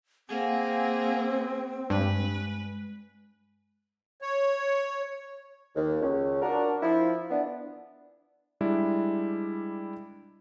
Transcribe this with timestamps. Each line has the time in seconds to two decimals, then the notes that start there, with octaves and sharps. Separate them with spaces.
0.29 A#3 C4 G#4 F5 F#5 G#5
1.90 G2 G#3 B4
4.22 C#5
5.75 D#2
6.02 C#2 C#4
6.42 D4 F#4 A#4
6.83 F3 E4
7.31 E3 B3 D4
8.61 G3 G#3 D4 E4 D5 E5